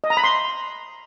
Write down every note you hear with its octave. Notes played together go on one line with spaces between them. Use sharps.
D#5
A#5
B5
C6